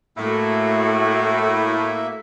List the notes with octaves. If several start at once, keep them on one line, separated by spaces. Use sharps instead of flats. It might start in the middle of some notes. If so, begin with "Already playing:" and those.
A2 A3 A#3 F#4 E5